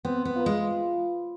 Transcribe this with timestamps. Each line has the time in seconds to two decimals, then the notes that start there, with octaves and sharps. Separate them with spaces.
0.05 B3 C4
0.25 B3
0.36 F4 B4
0.46 G#3